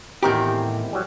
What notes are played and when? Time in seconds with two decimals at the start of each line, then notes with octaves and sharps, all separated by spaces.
0.23 E2 A2 D#3 C4 G4 A#5
0.93 F#3 G3